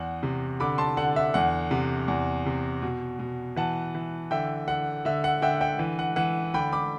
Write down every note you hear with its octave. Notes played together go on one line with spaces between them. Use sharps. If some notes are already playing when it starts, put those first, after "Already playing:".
Already playing: E2 F#5
C3
D3 B5 D6
A5 C6
D3 F#5
E5
E2 F#5
C3
E2
C3
B2
B2
E3 F#5 A5
E3
D3 E5 G5
D3 F#5
D3 E5
F#5
D3 E5 G5
E5 G5
E3
F#5
E3 F#5
D3 G5 B5
B5 D6